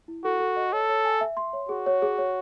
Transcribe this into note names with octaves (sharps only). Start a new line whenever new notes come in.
E4
F#4 A4
A4
D#5
A4 C#5
C#5
G#5
E5
C6
C#5
F#4 G#4
C#5
G#4
C#5